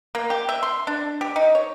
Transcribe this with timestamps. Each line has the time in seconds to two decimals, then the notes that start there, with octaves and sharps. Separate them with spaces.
0.15 A#3
0.30 G4
0.49 E5
0.63 C6
0.87 D4
1.21 G4
1.36 D#4
1.55 C#5